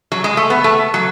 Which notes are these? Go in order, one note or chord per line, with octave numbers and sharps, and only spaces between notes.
F#3
G#3
A3
B3
A3
F#3